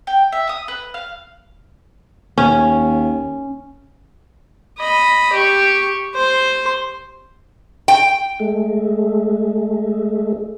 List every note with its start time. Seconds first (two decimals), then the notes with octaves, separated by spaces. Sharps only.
0.07 G5
0.32 E5
0.49 D#6
0.68 B4
0.94 F5
2.38 D#2 C#4
4.78 D#5 B5
5.33 G4 C#6
6.14 C5 C6
7.88 G5
8.39 G#3 A3